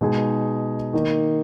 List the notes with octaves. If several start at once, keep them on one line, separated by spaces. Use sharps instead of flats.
B2 G#3 D#4 G#4
D#3 A#3 D#4